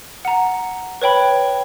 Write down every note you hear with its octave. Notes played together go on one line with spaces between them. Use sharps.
F#5 A#5
B4 C#5 G5 B5